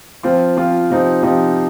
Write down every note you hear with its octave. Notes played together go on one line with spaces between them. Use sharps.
F3 C4 F4
F3 C4 F4
C3 F3 C4 D#4
C3 F3 C4 D#4